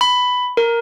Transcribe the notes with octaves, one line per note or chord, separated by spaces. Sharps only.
B5
A#4